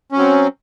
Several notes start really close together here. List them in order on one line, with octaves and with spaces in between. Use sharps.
C#4 F#3 C4